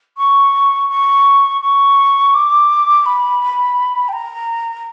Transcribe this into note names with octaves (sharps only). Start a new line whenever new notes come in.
C#6
C#6
C#6
D6
B5
G5
A#5